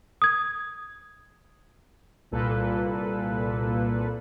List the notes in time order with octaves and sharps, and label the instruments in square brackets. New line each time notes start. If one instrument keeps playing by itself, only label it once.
[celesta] D#6 G#6
[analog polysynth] C2 A#2 A#3 A4 B4